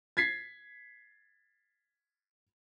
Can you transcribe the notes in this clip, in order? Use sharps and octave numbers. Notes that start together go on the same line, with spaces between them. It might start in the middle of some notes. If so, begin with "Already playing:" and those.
G#6 A6 B6 C7